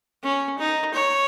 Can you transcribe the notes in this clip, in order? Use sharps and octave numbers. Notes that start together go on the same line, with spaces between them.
C#4
D#4
C#5